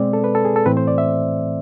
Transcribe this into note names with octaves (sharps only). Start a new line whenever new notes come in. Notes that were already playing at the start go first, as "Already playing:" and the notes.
Already playing: B2 G#3 C4 D5
A4
B4
A4
G#4
A4
A2 E3 A3 C4 B4
C5
D5
E5